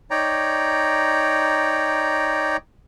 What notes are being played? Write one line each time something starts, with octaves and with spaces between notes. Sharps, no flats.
D#4 C#5 D5 G5 A#5